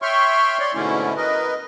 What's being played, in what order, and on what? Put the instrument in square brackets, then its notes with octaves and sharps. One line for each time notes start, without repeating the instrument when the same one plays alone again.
[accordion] C#5 E5 G5 C6 C#6 F6
C#5 D5 C6
G#2 B2 D3 A3 C#4 E4
A#4 B4 D#5